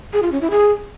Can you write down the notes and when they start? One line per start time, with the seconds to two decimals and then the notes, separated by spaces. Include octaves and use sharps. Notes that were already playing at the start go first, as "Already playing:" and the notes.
0.13 G#4
0.23 F4
0.32 C#4
0.41 E4
0.51 G#4